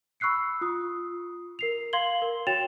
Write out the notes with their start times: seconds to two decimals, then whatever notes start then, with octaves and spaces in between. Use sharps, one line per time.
0.20 B5 C#6 E6 F#6 C7 C#7
0.61 F4 D#6
1.59 A#4 C7 F7
1.93 F5 C6 G#6 C7 F#7 G7
2.22 A#4
2.47 F#4 C#5 G5 A6 E7 F7